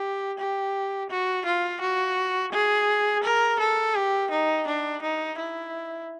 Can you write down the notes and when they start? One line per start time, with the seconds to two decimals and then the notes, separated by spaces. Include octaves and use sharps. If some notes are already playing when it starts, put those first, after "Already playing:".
Already playing: G4
0.39 G4
1.10 F#4
1.46 F4
1.81 F#4
2.53 G#4
3.24 A#4
3.60 A4
3.95 G4
4.31 D#4
4.67 D4
5.02 D#4
5.38 E4